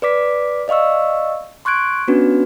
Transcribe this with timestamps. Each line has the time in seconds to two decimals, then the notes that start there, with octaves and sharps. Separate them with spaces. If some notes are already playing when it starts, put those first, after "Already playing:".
0.02 B4 D5 D6 B6
0.68 D5 D#5 F5 C#6 E6
1.65 C6 C#6 F#6 G#6 D7
2.08 B3 C#4 D4 F#4 B4